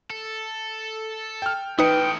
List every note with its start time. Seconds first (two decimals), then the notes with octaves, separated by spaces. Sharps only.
0.10 A4
1.42 G5 F6
1.79 A2 E3 D#4 B4 G5 D#6 C#7